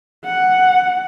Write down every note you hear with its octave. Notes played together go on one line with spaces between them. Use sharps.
F#5